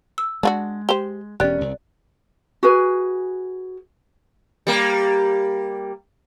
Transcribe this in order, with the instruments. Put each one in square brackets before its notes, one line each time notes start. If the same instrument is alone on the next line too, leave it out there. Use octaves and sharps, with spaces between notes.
[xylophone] E6
[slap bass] G#3 [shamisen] D4 F4 F#4
[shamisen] G4 C5 [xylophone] G7
[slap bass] E1 C#4 [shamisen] G4 [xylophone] D5 F#6
[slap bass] C2
[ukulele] F#4 G#4 B4 G#5
[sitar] G3 A#3